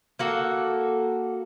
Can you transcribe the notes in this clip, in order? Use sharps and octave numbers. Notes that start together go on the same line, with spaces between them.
A#3 F#4 A4